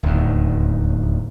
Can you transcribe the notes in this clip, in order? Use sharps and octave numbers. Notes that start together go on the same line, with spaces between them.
D1 D#2